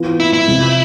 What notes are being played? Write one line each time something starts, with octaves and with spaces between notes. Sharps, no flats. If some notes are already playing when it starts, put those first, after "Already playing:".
Already playing: E3 B3 F4
E4
E4
C3 F3 G#3